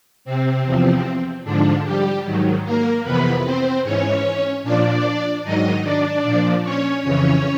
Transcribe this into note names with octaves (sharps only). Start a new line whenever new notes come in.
C3 C4
E2 C3 F3
G#2 D3 F3 D4
G3 G4
G#2 D#3 F#3
A#3 A#4
F2 C3 E3 B3 B4
C4 C5
G#2 E3 C#4 C#5
A#2 F3 D4 D5
G#2 D#3 F#3 D#4 D#5
D4 D5
A#2 F3
C#4 C#5
F2 C#3 E3 C#4 C#5